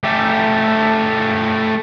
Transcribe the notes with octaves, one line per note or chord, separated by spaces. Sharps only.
A3 G4